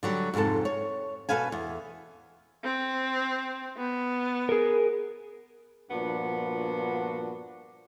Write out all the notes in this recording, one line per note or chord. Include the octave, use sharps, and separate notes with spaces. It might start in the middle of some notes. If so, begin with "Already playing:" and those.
D3 F#3 G3
F2 G#2 C3 A4 A5
C#5
B2 A4 B4 F5 G#5
E2
C4
B3
G#4 A#4
G2 A#2 F3 B3 D4 F#4